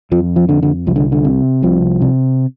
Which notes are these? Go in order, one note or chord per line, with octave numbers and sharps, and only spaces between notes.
F2 F3
F3
D3
D3
C2 F3
D3
D3
C3
C2 F3
C3